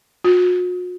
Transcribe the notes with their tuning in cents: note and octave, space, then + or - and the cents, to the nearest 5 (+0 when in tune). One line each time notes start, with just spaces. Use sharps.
F#4 -45